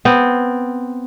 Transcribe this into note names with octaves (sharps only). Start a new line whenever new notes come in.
B3 C4